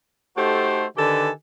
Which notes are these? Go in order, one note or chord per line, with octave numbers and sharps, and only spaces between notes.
A3 D#4 F#4 G4 A4 C5
D3 D#3 G4 A4 B4 G#5